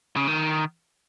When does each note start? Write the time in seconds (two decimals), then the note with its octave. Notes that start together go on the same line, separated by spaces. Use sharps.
0.16 C#3
0.27 D#3